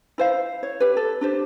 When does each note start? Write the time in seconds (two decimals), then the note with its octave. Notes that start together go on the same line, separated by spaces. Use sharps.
0.18 E4 C5 F5
0.63 C#5
0.80 G4 B4
0.97 A4
1.21 D4 G4 C5